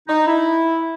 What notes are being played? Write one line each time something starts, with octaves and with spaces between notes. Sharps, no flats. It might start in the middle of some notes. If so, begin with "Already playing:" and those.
D#4
E4